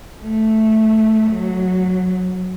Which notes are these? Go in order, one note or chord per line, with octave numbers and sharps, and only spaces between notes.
A3
F#3